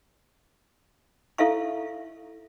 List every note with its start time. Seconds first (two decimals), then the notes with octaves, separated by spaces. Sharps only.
1.38 E4 A4 E5 F5 C#6